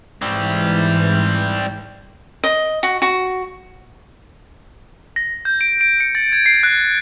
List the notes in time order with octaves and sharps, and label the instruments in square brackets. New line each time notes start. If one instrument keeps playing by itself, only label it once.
[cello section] G#2 E3 [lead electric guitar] G3 C4
[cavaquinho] D#5
F#4
F#4
[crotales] A#6
G6
D7
D7
C#7
A6
G#6
C7
F#6